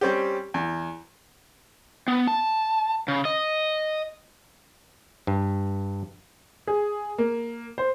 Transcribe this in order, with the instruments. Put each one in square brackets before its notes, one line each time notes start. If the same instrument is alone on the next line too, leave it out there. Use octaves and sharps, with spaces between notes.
[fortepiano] G3 C4 C#4 G4
E2
[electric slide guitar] B3
A5
C#3
D#5
[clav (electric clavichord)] G2
[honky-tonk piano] G#4
A#3
C5